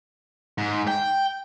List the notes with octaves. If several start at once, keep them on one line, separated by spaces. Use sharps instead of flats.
G#2
G5